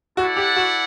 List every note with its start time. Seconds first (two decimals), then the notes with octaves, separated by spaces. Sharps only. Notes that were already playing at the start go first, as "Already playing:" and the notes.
0.17 E4 F#4 A4 D5 F#5
0.36 G4
0.56 F#4